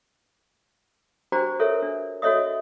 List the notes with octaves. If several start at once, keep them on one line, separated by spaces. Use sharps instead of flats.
D4 F#4 G4 C5 G5 A#5
A4 A#4 C#5 E5
D4
F#4 A4 C#5 D#5 E5 D#6